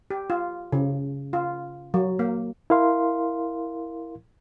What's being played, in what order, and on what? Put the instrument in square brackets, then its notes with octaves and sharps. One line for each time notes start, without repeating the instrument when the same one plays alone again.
[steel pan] G4
F4
C#3
F4
F#3
A#3
[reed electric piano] E4 A#4 F5 C6